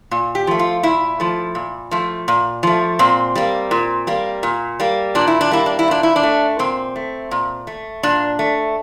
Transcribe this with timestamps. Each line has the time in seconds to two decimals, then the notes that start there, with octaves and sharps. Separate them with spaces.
0.11 A#2
0.35 G4
0.47 F3 A3
0.59 F4
0.83 A#2 E4
1.20 F3 A3
1.55 A#2
1.91 F3 A3
2.28 A#2
2.63 F3 A3
2.99 A#2 C4
3.36 G3 A#3
3.71 A#2
4.07 G3 A#3
4.43 A#2
4.80 G3 A#3
5.15 A#2 D4
5.27 E4
5.41 D4
5.51 G3 A#3 E4
5.66 D4
5.79 E4
5.88 A#2 D4
6.03 E4
6.16 D4
6.23 A3
6.59 A#2 C4
6.96 A3
7.31 A#2
7.67 A3
8.03 A#2 D4
8.39 A3